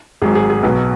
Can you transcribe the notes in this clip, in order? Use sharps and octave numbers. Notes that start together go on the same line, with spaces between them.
G#1 G#2 F#3 G#4
G#4
G#4
B1 B2 F#3 B4